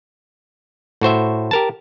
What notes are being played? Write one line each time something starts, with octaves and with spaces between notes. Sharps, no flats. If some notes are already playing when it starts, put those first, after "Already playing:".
A2 F#4 C5 E5
G4 A#4 A5